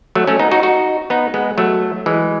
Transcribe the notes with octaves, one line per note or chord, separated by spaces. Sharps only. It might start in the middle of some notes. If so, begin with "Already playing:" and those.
F#3 A3
A3 C#4
B3 D#4
D#4 F#4
D#4 F#4
B3 D#4
G#3 B3
F#3 A3
E3 G#3